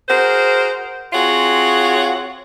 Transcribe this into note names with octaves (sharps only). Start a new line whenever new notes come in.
F#4 G#4 A#4 C5
C4 F4 F#4 G#4 C#5